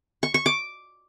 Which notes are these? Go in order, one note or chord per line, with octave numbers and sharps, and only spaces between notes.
C#6
C#6
D6